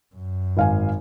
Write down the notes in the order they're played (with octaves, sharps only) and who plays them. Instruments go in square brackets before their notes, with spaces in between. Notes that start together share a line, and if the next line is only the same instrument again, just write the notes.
[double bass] F#2
[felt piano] G#1 F5 G#5